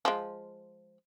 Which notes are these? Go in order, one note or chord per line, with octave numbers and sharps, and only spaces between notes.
F3 G#3